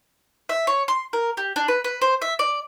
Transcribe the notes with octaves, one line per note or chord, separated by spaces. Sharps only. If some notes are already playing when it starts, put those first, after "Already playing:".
E5
C#5
C6
A#4
G4
D4
B4
B4
C5
E5
D5